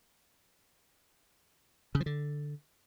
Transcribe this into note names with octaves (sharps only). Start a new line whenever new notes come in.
C#3
F3
D3